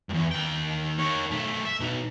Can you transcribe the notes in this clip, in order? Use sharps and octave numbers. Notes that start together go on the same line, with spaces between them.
E2 G2
D#2 G5
D#3 C#5
B1 A3
E5
B2 D#4